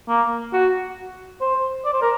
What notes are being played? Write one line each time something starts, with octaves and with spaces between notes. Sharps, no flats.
A#3
F#4
C5
D5
C5
A#4